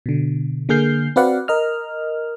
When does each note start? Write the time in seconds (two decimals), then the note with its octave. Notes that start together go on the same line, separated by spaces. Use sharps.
0.06 B2 D3
0.69 D3 A#3 G#4 F6 G6 C7
1.16 C4 F#4 B4 D5 F5 F#5
1.48 A#4 D#5 F6